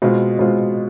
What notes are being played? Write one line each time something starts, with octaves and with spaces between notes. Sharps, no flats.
B2 G#3 C4 F4
B2 G#3 C4 F4